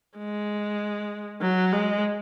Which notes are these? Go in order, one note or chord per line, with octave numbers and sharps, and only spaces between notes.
G#3
F#3
G#3